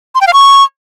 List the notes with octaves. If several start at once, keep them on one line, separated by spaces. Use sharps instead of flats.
C6
G5
F5
C#6